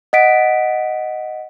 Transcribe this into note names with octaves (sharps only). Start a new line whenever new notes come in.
D#5 F#5 B6 D7